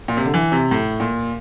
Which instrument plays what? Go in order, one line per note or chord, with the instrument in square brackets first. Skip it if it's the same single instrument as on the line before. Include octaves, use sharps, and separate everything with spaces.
[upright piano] A#2
C3
D3
E3
C3
A2
A#2